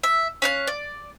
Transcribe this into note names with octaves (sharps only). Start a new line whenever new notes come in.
E5
C#4 F5 F#6
D5